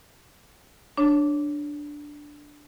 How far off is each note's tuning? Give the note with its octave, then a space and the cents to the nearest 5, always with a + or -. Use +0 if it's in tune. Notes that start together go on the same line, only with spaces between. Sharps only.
D4 +0 C#5 +0